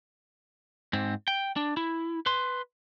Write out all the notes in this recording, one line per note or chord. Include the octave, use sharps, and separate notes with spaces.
G#2 C4
G5
D4
E4
B4 C6